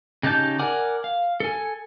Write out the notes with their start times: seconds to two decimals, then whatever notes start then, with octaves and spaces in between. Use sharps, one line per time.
0.23 C#3 D#4 G4 A5 G6
0.59 A#4 D5 F#5 G#5 D6
1.04 F5
1.40 A4 G#5